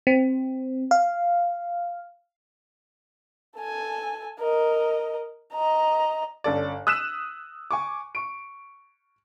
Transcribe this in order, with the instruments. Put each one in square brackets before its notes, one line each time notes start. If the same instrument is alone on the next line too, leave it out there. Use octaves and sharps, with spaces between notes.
[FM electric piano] C4
F5
[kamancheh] A4 G#5
A#4 D#5
D#5 A#5
[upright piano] G1 C#4 A4 D5
D#6 E6 F#6 B6 D#7 E7
G#5 C#6 D6
C#6 D7